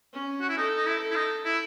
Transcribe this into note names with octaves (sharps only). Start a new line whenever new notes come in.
C#4
F#4
E4
D#4 A4
D#4
E4
A4
E4
D#4
E4